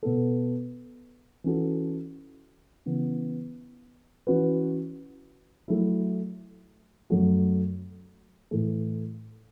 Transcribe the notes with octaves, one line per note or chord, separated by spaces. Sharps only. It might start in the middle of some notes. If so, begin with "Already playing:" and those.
B2 B3 A4
E3 C#4 F#4 A4
C#3 E3 B3
E3 C#4 F#4 B4
F#3 A3 E4
F#2 F#3 A3 F#4
A2 E3 A3